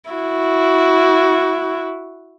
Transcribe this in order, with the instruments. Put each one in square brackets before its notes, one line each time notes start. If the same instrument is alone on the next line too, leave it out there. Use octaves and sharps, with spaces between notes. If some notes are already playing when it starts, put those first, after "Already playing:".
[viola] E4 F#4